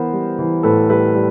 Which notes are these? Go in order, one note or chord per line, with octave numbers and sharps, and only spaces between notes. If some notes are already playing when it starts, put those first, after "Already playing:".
Already playing: E3 B3 A#4 C5
G3
E3
A2 A4 B4
G3 A4 B4
G3